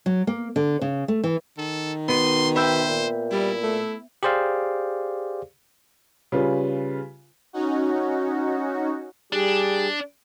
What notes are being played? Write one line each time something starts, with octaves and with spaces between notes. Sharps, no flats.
F#3
A#3
D3
C#3
A3
E3
D#3 A4
B2 B3 C6 D#7
B4 C5 E5 G5
A#2
G3 E4
A3
G4 G#4 C5 D5 F5
C#3 G3 F4 B4
C#4 D#4 F#4
G3 D4 G4 G#4